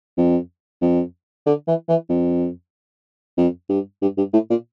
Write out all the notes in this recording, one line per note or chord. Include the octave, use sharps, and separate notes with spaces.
F2
F2
D3
E3
E3
F2
F2
G2
G2
G2
A2
A#2